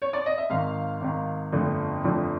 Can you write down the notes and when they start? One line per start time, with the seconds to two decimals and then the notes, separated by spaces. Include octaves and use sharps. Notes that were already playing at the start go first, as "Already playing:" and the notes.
0.02 C#5
0.13 D5
0.26 D#5
0.38 E5
0.50 G#1 G#2 D#3 F5
1.01 G#1 G#2 D#3
1.52 G1 F2 D3 F3 A3
2.04 G1 F2 D3 F3 A3